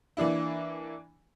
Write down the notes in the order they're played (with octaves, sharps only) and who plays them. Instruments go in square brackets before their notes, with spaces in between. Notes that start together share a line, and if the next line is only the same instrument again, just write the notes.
[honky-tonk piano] E3 A#3 D4 E4